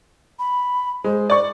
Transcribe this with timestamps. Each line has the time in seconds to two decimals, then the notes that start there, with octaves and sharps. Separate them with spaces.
0.39 B5
1.04 G#3 C5
1.30 D5 C#6